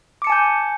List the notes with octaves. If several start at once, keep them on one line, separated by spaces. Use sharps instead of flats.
G#5 A5 D6 G6 C#7